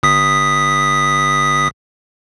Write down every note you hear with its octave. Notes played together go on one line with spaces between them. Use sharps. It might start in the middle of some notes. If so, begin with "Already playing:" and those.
G1 D#6 B6